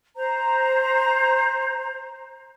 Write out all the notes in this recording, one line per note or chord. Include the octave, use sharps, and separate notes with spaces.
C5 A#5